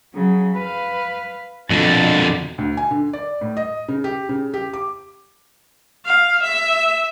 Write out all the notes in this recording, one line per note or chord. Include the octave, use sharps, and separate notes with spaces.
C#3 F#3
B4 F5
F2 B2 D3 A6
D2
G#5
D3
D5
A2
D#5
C#3
G4
C#3
G4
D6
F5
E5